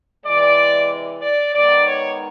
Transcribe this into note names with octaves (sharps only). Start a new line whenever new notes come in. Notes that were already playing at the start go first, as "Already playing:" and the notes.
C3 E3 G#3 D5
D5
D#3 G#3 B3 D#4 D5
C#5